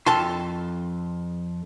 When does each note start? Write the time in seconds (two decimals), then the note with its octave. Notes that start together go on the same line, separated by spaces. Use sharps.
0.06 F2 A5 C6